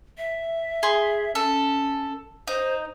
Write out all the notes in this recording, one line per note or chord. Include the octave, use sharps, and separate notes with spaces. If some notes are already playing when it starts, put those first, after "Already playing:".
E5
G#4 C6
C#4 A4
D#4 C5